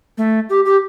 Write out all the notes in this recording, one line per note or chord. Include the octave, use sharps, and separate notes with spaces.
A3
G4
G4